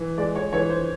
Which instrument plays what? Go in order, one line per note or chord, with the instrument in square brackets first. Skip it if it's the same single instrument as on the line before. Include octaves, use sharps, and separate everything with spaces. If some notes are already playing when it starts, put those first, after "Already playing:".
Already playing: [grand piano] E3
[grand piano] G#3 [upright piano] D5
[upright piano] C#5
[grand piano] E3 [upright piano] C#5
[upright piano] C5